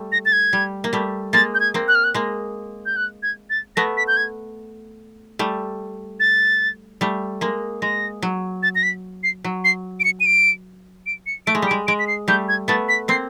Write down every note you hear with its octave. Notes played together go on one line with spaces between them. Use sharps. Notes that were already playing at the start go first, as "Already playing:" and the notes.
Already playing: G3 A3
A#6
A6
G#6
G3
A#3
G3 A3
G#3 A#3 A6
G6
G#6
A#3 C4
F#6
F6
F#6
G#3 A#3
G6
F#6
G#6
A6
A3 B3 A#6
B6
G6
G#6
G3 A3
A6
G3 A3
G#3 A#3
G#3 A#6
F#3
A6
A#6
B6
C7
F#3
C7
D7
C#7
D#7
D7
D7
C#7
A3 D7
G#3
G3 D7
G#3
G#3 D7
B6
C7
G3 A3 G6
G#6
A3 B3 A6
B6
A#3 C4 C7